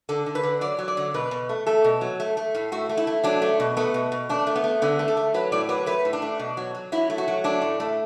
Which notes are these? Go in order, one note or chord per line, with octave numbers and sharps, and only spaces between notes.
D3 A4
D3
B4
D3
F#3 D5
F#3
D5
D3
B2 B4
B2
A3
A3 A4
B2
F#3
A3
A3
A2
A3 F#4
A3
E4
A3
F#3 D4
A3
B2
A3 B3
B2
B2
A3 D4
A3
B3
A3
D3 B3
A3
A4
A3
F#3 B4
A2 D5
F#3 B4
A3 B4
A2
D4
A3
B2
F#3
F#3
F#3 E4
A3
F#4
F#3
A3 D4
A2
A3